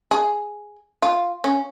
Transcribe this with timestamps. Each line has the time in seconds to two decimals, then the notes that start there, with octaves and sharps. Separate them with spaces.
0.11 G#4
1.02 F4
1.44 C#4